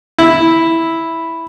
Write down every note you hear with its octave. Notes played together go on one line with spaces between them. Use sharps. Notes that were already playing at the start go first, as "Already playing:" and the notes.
E4